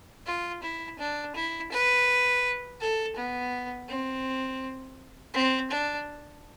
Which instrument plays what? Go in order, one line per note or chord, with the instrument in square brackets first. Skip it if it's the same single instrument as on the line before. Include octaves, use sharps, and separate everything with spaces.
[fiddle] F4
E4
D4
E4
B4
A4
B3
C4
C4
D4